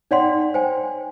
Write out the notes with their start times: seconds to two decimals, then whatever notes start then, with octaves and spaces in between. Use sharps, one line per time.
0.11 D#4 C#5 D5 F#5 G5 C6
0.54 C5 G5 G#5